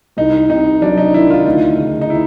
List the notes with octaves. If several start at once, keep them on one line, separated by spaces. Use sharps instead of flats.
C2 D#4
C3 D#4
F#3 D4
D#4
D#3 E4
F4
D2 D#4
C#3
D#4
E3 E4